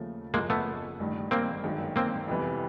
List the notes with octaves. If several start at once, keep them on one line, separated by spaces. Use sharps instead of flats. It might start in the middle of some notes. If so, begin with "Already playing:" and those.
Already playing: D#2 C#3 F3 A3
F#1 F2 C#3 F3 G#3 A#3
A3 B3
A1 G2 D#3
A#3 C4
G1 F#2 D#3 G#3
A#3 C4
F2 C3 E3 G3 B3